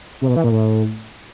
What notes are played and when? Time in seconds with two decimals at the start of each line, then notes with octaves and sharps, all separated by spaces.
0.21 C3
0.29 B2
0.36 E3
0.44 A#2
0.51 A2